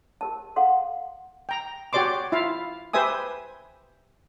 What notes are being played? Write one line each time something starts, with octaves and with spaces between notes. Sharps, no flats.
G4 A#4 A5
A4 F5 F#5 C6
G5 A#5
F#4 G4 C#5 D5 C6 D6
E4 F4 E5 F5
G4 B4 C5 E5 G#5 D#6